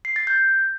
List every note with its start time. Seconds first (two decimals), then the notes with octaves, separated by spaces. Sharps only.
0.05 C7
0.16 A6
0.27 G6